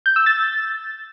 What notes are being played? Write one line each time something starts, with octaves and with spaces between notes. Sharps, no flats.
G6
E6
A6